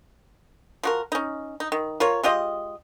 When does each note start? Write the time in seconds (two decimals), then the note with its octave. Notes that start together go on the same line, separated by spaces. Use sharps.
0.83 F3 F#4 A#4
1.12 C#4 D#4
1.60 D#4
1.72 D#3
2.00 F4 A#4 C#5
2.23 G#3 F4 G4 D#5